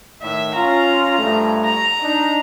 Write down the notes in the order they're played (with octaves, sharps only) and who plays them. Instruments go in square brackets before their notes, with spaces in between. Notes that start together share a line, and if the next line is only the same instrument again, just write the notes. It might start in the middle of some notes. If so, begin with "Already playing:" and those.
[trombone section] A2 D#3 [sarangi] E5
[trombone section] C#4 F4 [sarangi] A#5
[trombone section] G2 F3 A3
[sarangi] A#5
[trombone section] D4 D#4